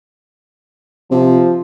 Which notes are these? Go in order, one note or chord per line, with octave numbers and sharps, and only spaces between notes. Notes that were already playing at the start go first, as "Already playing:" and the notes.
C3 F3